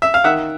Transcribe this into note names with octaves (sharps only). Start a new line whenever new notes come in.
E5
F5
D#3 E5 F#5